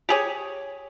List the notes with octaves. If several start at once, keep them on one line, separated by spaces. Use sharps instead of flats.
G4 G#4 C#5